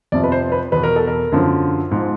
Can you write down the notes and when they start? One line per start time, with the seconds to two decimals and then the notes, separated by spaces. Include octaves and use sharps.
0.12 F2 C3 F3 D5
0.24 B4
0.32 C5
0.52 B4
0.72 E2 B2 B4
0.83 A#4
0.96 A4
1.07 A#4
1.32 F#2 D3 F3
1.91 G#2 F3